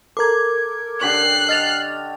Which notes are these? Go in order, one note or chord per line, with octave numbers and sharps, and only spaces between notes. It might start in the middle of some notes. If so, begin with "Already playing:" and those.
A4 A#4 D6 G#6
D3 G4 C#5 F#6 C7
D#5 F6 A6 F7